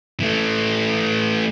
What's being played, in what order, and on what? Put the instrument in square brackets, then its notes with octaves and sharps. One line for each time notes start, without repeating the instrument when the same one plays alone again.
[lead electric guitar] E3 A3